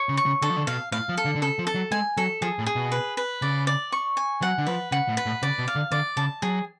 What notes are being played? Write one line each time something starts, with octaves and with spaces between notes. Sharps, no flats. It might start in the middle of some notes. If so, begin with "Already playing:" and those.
Already playing: C#5
C#3
C#6
C#3
D3 A4
F3
D3
B2 F5
A2 F5
F3
A4
D3
D3
C#3 A4
F3
A4
F#3
G#3 G#5
F#3 A4
F3 G#4
A2
G#4
B2
B4
B4
C#3 D5
D5
C#6
G#5
F#3 F#5
D3
F3 B4
C#3 F#5
A2
B4
A2
C#3 D5
B2
F5
D3
D3 D5
C#3 A5
F#3 G#4